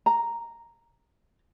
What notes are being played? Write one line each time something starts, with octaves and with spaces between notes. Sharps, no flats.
A#5